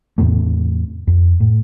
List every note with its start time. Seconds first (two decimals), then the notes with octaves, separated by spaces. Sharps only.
0.18 E2 A2 C3 A3
1.07 F2
1.40 A2